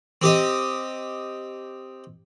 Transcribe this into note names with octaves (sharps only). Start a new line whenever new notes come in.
C4 G4 D#5